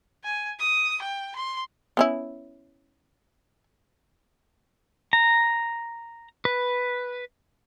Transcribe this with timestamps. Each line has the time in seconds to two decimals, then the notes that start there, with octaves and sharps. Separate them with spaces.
0.23 G#5
0.59 D#6
1.02 G5
1.35 C6
1.97 B3 C#4 E4
5.13 A#5
6.45 B4